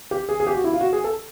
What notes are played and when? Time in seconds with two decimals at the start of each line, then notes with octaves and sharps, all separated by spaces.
0.11 G4
0.29 G#4
0.40 G#4
0.47 G4
0.55 F#4
0.64 E4
0.73 F4
0.81 F#4
0.93 G#4
1.04 A4